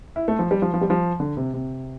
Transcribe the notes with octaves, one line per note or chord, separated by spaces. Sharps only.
E4
A3
F3
G3
F3
F3
G3
F3
D3
C3
C3